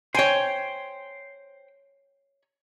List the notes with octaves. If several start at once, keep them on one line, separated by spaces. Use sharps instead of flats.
C5 C#5 G5 G#5